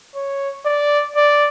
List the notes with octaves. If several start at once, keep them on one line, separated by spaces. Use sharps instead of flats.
C#5
D5
D5